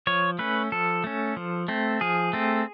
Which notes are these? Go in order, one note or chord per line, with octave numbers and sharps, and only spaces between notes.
F3 C#5
A3 C#4 B4
F3 A4
A3 C#4
F3
A3 C4
F3 G#4
A3 C4